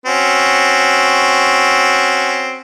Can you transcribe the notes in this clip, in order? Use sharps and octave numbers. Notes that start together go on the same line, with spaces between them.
C4 C#4 F#4